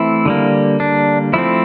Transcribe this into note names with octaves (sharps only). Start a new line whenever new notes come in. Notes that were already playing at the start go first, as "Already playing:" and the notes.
Already playing: E3 A3 C4 E4
D3 G3 A#3
D4
F3 A3 C4 E4